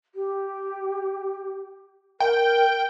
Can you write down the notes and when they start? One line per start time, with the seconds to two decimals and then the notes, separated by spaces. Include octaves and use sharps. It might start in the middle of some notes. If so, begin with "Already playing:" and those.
0.15 G4
2.20 A#4 G5